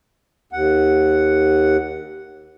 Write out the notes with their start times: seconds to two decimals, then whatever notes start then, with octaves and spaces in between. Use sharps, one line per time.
0.53 D#2 F#5